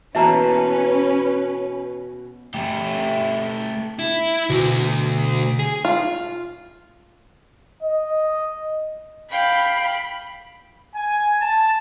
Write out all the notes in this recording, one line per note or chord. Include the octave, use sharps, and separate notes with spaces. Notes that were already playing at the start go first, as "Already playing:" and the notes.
B2 E3 A#3 C#4 B4 E5 A5 A#5
A3 G4
E4
D2 B2
G#4
F4
D#5
F5 G5 B5
G#5
A5